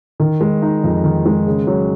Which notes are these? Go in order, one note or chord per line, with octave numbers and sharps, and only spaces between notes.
D#3
G#3
D#4
F2
D#3
G#3
C#3
F#3